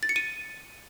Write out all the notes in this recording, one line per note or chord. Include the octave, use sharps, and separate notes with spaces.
A6
C#7
D#7